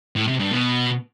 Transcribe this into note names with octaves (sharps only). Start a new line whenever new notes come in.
A2
C3
G2
B2